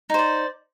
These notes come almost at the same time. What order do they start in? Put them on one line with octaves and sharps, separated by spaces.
D#4 C5 D5